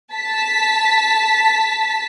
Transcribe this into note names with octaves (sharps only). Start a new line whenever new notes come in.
A5 B6